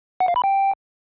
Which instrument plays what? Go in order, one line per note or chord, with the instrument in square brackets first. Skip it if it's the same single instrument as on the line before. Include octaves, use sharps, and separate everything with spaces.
[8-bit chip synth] F#5
F5
B5
G5